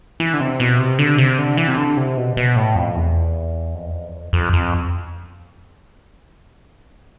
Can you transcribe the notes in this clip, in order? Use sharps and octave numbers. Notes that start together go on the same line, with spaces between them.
E3
D3
C3
B2
C3
D3
C3
D3
E3
C3
D3
C3
B2
B2
A2
F2
E2
F2
E2
F2
E2
F2
F2
F2